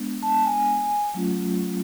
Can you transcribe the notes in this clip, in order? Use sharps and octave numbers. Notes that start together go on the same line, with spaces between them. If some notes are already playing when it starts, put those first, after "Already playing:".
Already playing: G#3 B3 D4
A5
G#5
F#3 A3 C#4 F4